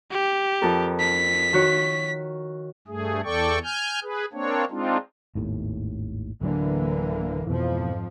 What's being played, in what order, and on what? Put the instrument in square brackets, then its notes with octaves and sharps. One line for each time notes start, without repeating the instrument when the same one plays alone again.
[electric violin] G4
[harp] F2 A4 A#4
[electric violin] B6
[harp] D#3 F#4 C#5
[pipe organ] G2 A3 G#4
E2 A4 D5 G5 C#6
G#5 F6 G6
G#4 B4
A#3 C4 D4 C#5
G#3 C4 D4 D#4 F4
[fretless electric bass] G#1 D#2 A2
[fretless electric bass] D1 F#3 D4 [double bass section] D3 E3 A#3
[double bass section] F2 G#2 F3 [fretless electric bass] B2 E3